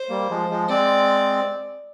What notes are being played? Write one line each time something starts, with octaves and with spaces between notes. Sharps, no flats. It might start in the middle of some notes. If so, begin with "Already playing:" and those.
Already playing: C5
G3 A#3
F3 G#3
F3 G#3
G#3 C4 D5